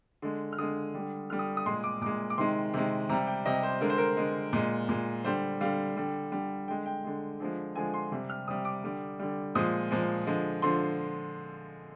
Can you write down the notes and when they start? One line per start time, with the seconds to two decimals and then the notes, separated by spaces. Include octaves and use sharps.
0.22 D3 G#3
0.53 F6
0.58 D3 G#3 D#6
0.95 D3 G3
1.30 D3 G3 F6
1.39 D#6
1.57 D#6
1.66 A#2 G#3 C6
1.84 D6
2.01 A#2 G#3 D6
2.30 D6
2.38 C3 D#3 G#3 C6
2.74 C3 D#3 G#3
3.09 C3 A#5
3.13 G3
3.27 G5
3.46 C3 G3 D#5
3.63 C5
3.81 D3 G#3 A#4
3.90 C5
3.98 A#4
4.17 D3 G#3
4.53 A#2 G#3
4.89 A#2 G#3
5.24 D3 G3 C5
5.61 D3 G3 F5
5.97 D3 G3
6.32 D3 G3
6.68 D3 G#3 G5
6.86 G5
7.04 D3 G#3
7.40 D3 F3 G#3
7.75 D3 F3 G#3 G#5
7.94 C6
8.12 C3 G3
8.30 F6
8.48 C3 G3 D#6
8.65 D6
8.83 D3 G3
9.19 D3 G3
9.55 A#2 F3 G#3 D#6
9.91 A#2 F3 G#3
10.27 D3 F3 G#3
10.62 D3 F3 C6